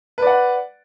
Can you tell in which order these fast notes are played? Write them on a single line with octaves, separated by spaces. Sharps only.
B4 D5 F#5